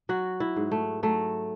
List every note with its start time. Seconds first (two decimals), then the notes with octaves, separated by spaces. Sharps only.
0.09 F#3 F#4
0.40 E4
0.56 G#2
0.71 A3
1.03 F#3 A3